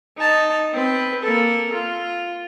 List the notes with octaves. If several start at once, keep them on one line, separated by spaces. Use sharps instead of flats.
D#4 A5
C4 B4
A#3 A4
F4